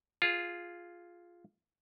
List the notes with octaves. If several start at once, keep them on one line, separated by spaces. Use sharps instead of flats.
F4 G#4